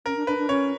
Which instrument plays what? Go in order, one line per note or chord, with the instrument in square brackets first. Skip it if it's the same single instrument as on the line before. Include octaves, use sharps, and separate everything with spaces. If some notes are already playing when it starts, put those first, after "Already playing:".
[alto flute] C#4 [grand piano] A#4
[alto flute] D4
[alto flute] D4 [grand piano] B4
[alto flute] D4
[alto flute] C#4 [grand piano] C#5